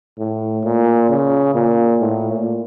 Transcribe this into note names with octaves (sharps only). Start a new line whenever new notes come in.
A2
A#2
C#3
A#2
A2
A#2